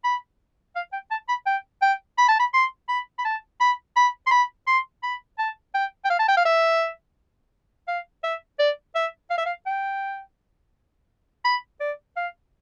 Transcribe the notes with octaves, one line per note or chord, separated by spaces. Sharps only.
B5
F5
G5
A5
B5
G5
G5
B5
A5
B5
C6
B5
B5
A5
B5
B5
C6
B5
C6
B5
A5
G5
G5
F5
A5
G5
F5
E5
F5
E5
D5
E5
F5
E5
F5
G5
B5
D5
F5